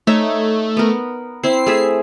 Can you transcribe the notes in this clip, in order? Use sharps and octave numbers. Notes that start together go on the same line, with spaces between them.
A3 D#4 C#5 E5
B3 A#4
C4 E4 C7
A3 G#4 E5